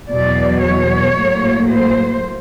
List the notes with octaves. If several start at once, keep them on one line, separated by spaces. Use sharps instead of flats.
E2 B2 F#3 D5
C#5
A2 F#3 A#3
C5